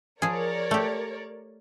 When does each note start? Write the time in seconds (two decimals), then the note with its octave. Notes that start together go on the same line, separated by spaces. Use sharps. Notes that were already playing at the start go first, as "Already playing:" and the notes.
0.22 F3 G#4 A#4 C#5 D5
0.71 A3 G4